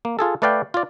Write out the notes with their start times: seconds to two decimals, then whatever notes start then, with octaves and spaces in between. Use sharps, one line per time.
0.05 A#3
0.19 F4 G#4 A4
0.42 A3 B4 D5 F5 G5
0.74 F4 D5